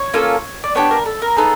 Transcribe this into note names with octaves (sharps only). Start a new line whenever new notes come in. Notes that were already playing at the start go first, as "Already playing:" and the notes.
Already playing: C#5
A#3 C#4 F4 A4
D5
B3 D4 G4 C#5
A#4
A4
A#4
B3 D#4 G#4 A4